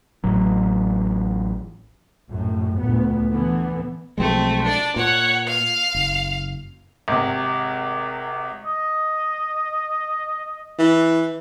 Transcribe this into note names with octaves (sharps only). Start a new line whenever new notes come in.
A1 F#3
A#1 F#2 A2
D2 A#2 B3
D3 E3 B3
B1 F3 G#3 A3 C4
D4 D5
A#2 C#5 F#5
F5
F#1
G#1 C3
D#5
E3